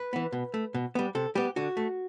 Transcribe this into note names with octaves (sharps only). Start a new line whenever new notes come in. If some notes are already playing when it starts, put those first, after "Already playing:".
Already playing: B4
E3 B3
B2
A3
B2
G3 B3
C3 A4
G3 B3 G4
D3 F#4
A3